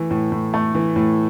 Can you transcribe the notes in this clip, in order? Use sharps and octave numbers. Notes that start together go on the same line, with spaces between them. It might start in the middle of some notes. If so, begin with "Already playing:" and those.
Already playing: E3 A3
A2
A2
A3
E3
A2